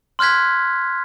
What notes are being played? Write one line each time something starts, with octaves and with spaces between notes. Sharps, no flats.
C6 F6 F#6 G#6 B6